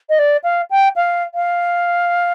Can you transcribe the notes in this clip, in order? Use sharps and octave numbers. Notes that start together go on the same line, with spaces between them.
D#5
D5
F5
G5
F5
F5